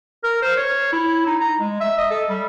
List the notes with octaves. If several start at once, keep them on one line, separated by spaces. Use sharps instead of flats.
A#4
C5
C#5
E4
D#4
A#5
G#3
E5
D#5
A4
G3